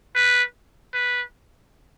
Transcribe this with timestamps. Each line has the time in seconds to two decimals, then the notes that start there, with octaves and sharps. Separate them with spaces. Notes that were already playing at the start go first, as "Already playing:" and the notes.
0.15 B4
0.94 B4